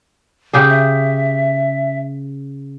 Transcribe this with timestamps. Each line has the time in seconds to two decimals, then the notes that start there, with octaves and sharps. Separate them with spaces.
0.53 C#3 G4 G#4
0.70 E5